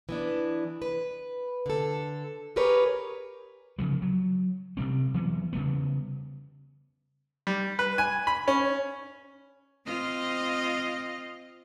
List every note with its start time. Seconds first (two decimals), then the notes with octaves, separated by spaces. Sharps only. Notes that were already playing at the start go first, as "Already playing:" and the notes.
0.09 E3 B3 D4
0.82 B4
1.66 D3 A4
2.56 G4 G#4 A#4 B4 C#5
3.78 C#3 F3 F#3
4.02 F#3
4.77 C3 G3 C4
5.14 E3 F#3 B3
5.53 C#3 G3 B3
7.47 G3
7.79 B4
7.98 G#5
8.27 B5
8.48 C#4
9.86 C4 F4 D#5